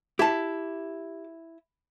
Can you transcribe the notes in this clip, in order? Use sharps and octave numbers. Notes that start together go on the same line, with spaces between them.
E4 G4 A5